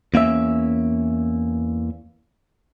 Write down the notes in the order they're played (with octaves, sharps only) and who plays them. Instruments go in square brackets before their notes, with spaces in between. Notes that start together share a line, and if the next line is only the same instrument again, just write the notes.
[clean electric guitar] E2 A#3 C#4 E5